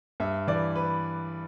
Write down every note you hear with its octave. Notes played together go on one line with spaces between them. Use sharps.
G2 E5
E3 D5
B4